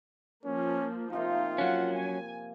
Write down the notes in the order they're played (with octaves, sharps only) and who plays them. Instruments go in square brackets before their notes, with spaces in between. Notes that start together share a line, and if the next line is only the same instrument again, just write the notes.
[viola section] F3 A#3 [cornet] C#4
[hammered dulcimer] C3 F3 A#3 [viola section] D#4 [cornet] F4
[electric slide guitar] F#3 C#4 [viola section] F#5
[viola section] G#5